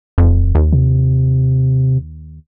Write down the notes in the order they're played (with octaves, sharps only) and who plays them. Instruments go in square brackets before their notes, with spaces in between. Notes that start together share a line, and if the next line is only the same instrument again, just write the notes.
[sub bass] D#1 [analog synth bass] F2
[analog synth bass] D#2
[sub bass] C3